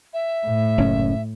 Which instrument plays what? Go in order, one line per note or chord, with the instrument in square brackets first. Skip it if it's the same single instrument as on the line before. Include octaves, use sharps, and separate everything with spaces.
[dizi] E5
[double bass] A2
[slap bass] F#1 C#4